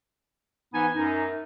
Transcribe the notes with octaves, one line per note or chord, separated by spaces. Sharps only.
G#2 E3 B3 D#4 G#5
F#2 D#4